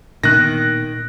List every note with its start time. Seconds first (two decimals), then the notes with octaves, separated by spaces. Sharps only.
0.23 A#2 D#3 A#3 B3 F#6 A#6